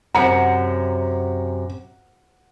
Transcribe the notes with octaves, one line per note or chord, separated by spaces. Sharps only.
F#2 C3 F#5 A#5 C#7